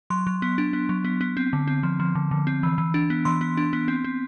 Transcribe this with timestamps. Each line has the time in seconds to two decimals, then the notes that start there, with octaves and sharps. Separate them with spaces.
0.10 F#3 C6
0.27 F#3
0.42 B3
0.58 D4
0.73 B3
0.89 F#3
1.05 B3
1.21 B3
1.37 C4
1.53 D3
1.67 C4
1.83 F3
2.00 F3
2.15 D3
2.31 D3
2.47 C4
2.63 E3
2.78 E3
2.94 D4
3.10 B3
3.25 E3 C6
3.41 B3
3.57 D4
3.73 B3
3.88 C4
4.04 C4